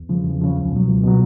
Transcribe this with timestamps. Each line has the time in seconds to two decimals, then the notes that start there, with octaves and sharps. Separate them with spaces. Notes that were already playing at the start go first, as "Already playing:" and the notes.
Already playing: E2
0.09 C#3 F3
0.25 E2
0.41 C#3 F3
0.56 C#2
0.72 B2 F#3
0.87 C#2
1.03 B2 F#3